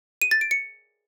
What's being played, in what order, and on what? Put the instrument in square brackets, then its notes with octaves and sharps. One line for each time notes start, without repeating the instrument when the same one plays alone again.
[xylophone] D#7
A6
D7
C#7